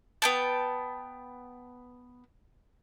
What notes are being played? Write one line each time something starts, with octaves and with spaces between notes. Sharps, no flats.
B3 G5 A5